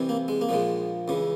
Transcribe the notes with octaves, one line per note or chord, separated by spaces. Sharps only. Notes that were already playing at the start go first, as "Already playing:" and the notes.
Already playing: C2 C3 E3
A#3
G#3
A#3
A#1 A#2 F3 G#3
C#2 C#3 E3